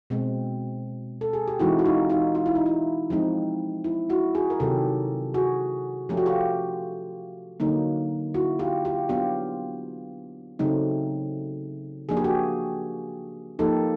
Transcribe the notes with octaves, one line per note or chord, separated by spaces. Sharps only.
B2 G#3 C4
A4
G#4
G4
E3 G#3 C4 D#4 E4 F#4
F#4
D#4 F4
D#4 F4
F4
E4
D#4
E4
F3 G#3 C4 D#4
E4
E4 F#4
F#4 G#4
A#4
C3 D#3 F#3 G4 A4
F#4 G#4
F3 A3 C#4 G4
F#4
F4 G4
D3 F#3 A#3 D#4
E4 F#4
F4 G4
F4 G4
F#3 B3 D4 F4 G4
C#3 F#3 A3 C4 D#4
F3 A#3 D4 G#4
G4
F#4 G#4
F3 A#3 D#4 G4 A4